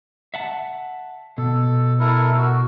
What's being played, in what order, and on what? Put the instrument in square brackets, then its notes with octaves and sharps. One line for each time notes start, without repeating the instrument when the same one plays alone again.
[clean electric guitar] E5 F#5 A5
[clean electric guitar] B2 [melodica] A4
[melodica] E4 A4 A#4
F#4